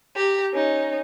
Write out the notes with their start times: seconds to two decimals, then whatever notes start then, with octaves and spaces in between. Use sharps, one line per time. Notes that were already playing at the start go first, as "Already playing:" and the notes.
0.15 G4 A#5
0.52 C#4 D#4